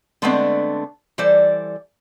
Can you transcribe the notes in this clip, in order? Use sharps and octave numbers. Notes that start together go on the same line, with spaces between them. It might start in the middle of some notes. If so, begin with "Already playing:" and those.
D3 G#3 A3 B3 C4 D4
E3 G3 A4 C5 D5